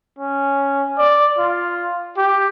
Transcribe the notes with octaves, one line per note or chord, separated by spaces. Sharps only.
C#4
D5
F4
G4